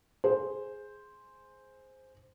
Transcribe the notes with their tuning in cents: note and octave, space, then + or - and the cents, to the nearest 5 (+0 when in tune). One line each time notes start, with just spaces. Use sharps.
G#4 +0 C5 +0